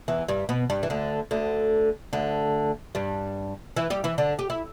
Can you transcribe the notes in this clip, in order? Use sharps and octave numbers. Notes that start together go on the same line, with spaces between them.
E2 E3
G2 G3
B2 B3
G2 G3
E3
D2 D3
D2 D3
D2 D3
G2 G3
E3 E4
G3 G4
E3 E4
D3 D4
G4
E4